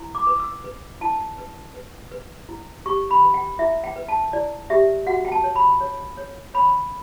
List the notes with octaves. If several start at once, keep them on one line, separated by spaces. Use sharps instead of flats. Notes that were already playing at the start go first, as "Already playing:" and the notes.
Already playing: E4
D6
B4
E6
B4
E4 A5
B4
B4
B4
E4
G4 C#6
B5
B4
G5
E4 E5
G5
B4
A5
E4 D5
G4 E5
F#4 F#5
G5
A5
C#5
B5
C#5
C#5
C#5 B5